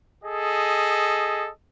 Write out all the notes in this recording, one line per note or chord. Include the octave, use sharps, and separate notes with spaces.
G#4 A4 D#5